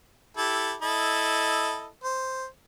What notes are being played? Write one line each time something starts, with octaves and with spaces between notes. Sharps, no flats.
E4 G4 A4
E4 A4 D#5
C5